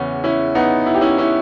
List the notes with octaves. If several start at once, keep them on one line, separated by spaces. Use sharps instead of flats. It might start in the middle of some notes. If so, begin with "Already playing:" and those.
Already playing: E2 C#3 E3 B3 C#4
C#4 E4
B3 D#4
E4
G4
C#4 E4
C#4 E4